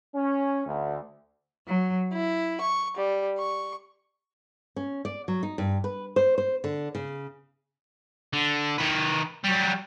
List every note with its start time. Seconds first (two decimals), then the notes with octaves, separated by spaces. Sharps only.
0.15 C#4
0.67 D2
1.66 F#3
2.12 E4
2.59 C#6
2.97 G3
3.38 C#6
4.76 C#4
5.05 D5
5.28 F#3
5.43 D#4
5.58 G2
5.84 B4
6.16 C5
6.38 C5
6.64 D3
6.95 C#3
8.33 D3
8.78 D#3 B4
9.44 F#3 G3